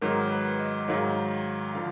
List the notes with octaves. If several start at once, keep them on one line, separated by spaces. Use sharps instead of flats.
G#2 D#3 F#3 A#4
B4
D#5
G#2 D#3 F#3 F5
D3 F3 F5